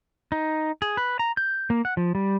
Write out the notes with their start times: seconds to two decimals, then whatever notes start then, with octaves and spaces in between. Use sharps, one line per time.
0.32 D#4
0.82 G#4
0.97 B4
1.19 A#5
1.37 G6
1.70 A#3
1.85 F#5
1.97 F3
2.15 G3